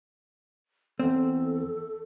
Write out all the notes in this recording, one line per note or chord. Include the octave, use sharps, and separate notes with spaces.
E2 C4 A4